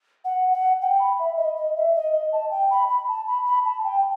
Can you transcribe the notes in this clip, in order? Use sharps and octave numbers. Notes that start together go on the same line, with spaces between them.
F#5
F#5
G5
B5
E5
D#5
D#5
E5
D#5
D#5
A5
G5
B5
B5
A5
B5
B5
A5
G5